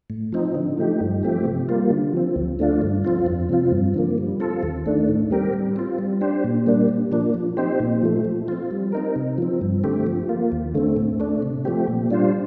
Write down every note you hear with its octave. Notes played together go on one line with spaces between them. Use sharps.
A2
F3 C4 D#4
D3
F3 A3 D#4 G4
G2
F3 A3 C4 G4
C3
G3 A#3 F4
D3
F3 C4
D2
D3 A3 D4 F4
G2
F3 C4 F4
F2
C3 F3 C4 F4
G2
D3 F3 A#3
G3
C4 F4 A4
D#2
D#3 A3 D4
A2
G3 C4 G4 A#4
G3
C4 F4
G3
D4 G4 C5
A#2
G3 A#3 D4
A#2
F3 A#3 D4
F3
C4 D#4 G4 C5
A#2
F3 A3
F3
C4 F4
G3
C4 D#4 A#4
C3
F3 C4
G2
D3 A3 C4 G4
F3
A#3 F4
D#2
D3 A3 C4
A2
A3 D4
C3
F3 A3 C4 G4
A#2
G3 D4 F4 C5